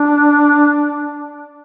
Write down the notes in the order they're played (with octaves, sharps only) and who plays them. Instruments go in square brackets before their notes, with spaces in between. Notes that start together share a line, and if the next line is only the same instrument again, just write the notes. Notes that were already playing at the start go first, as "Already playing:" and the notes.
Already playing: [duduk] D4